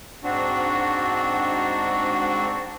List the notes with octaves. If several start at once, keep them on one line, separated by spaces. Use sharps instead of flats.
G#2 C4 D4 F#4